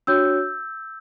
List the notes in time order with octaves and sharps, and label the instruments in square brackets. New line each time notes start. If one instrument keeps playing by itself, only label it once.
[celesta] D4 F#4 C#5 E6 G6